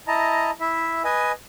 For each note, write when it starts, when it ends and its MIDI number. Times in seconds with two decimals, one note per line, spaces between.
0.08 0.51 64
0.08 0.51 75
0.08 0.51 81
0.08 0.51 82
0.60 1.02 64
0.60 1.02 76
1.04 1.32 71
1.04 1.32 75
1.04 1.32 80